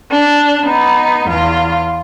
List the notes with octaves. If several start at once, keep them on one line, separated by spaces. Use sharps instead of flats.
D4
B3 D#4
E2 F4